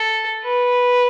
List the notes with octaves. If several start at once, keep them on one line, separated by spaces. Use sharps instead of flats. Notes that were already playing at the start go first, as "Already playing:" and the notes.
Already playing: A4
B4